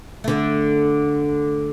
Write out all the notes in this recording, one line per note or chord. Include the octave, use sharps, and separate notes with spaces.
D3 A3